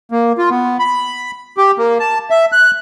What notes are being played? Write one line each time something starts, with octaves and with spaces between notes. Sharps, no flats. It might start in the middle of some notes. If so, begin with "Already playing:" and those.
A#3
F4
B3
B5
G4
A#3
A5
E5
F#6